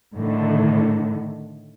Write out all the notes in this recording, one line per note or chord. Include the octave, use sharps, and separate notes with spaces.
A2 D3 D#3